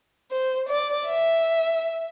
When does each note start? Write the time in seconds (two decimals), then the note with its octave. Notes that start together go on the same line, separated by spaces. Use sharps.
0.31 C5
0.69 D5
1.07 E5